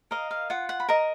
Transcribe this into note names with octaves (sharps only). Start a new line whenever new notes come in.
A#4 D#5 F5
F5
F4 F#5
F#5
B5
A#4 D#5 A#5